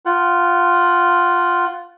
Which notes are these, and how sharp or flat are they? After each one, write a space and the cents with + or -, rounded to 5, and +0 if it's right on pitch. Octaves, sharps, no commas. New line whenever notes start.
F4 +0 F#5 +20